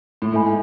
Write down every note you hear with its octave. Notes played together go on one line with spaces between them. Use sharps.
A2
G#2 E4 A4 E5 G#5 B5